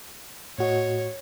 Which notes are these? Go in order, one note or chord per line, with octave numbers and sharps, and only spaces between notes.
A2 F#4 C#5 D#5